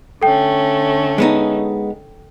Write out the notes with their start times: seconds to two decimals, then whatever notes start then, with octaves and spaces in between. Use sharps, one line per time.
0.22 D3 A3 C#4 A4 G5
1.18 G#3 B3 D#4